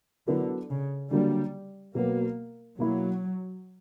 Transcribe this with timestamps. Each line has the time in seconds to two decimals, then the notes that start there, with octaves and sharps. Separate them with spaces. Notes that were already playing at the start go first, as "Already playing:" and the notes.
0.27 D3 F#3 B3 E4 A#4
0.70 C#3
1.11 D3 F#3 G3 A#3 D4
1.95 B2 F#3 A#3 B3
2.78 B2 F#3 A#3 E4